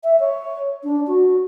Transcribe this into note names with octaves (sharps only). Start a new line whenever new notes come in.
E5
C#5
D4
F#4